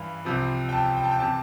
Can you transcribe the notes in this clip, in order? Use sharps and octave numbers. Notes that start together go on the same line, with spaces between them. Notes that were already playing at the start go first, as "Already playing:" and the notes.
Already playing: G2 E3 F5 B5
C2 C3 F3
G5
A5
G5
A5
G5
C3 E3 A5